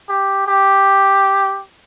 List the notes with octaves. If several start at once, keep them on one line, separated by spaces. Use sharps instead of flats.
G4
G4